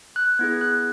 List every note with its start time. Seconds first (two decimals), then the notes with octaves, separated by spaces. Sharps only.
0.16 F#6
0.39 B3 E4 G#4 G#6
0.61 F#6